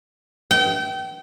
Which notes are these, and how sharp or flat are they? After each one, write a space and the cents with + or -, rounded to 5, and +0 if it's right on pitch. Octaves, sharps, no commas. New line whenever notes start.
G5 -30